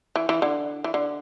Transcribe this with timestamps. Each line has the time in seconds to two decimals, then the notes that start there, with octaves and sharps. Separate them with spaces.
0.16 E3
0.29 E3
0.42 D3
0.84 E3
0.94 D3